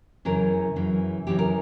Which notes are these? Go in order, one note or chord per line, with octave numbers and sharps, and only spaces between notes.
F#2 C#3 E3 A#4
F#2 C#3 E3
F#2 C#3 E3 G4
A#4